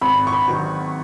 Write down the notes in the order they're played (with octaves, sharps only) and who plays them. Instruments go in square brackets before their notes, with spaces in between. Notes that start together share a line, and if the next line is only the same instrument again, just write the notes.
[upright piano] G#1 B5
C#6
B5
D#3 F#3